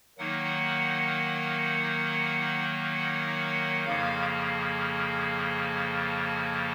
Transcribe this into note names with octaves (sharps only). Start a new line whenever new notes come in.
D#3 F#3 A#3 D#4 F#5
F#5
F2 C#3 F3 A#3 F5